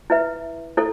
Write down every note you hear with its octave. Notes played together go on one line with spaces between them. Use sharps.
E4 B4 E5
E4 A4